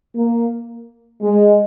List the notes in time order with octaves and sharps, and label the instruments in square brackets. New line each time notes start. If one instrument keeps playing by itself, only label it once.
[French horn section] A#3
G#3